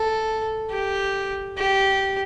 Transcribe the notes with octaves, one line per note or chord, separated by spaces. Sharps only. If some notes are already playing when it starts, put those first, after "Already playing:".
Already playing: A4
G4
G4